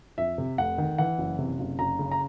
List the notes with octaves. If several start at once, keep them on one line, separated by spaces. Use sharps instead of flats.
F2 E5
C3
F1 F#5
D#3
E3 F#5
F#1
C3
F#1
F#1 A#5
C#3
A#5